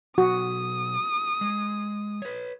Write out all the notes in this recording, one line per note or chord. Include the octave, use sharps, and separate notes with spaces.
B2 F#3 F#4 D#6
G#3
B4 C#5